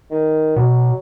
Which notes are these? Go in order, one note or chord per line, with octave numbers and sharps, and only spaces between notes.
D#3
B2 F#3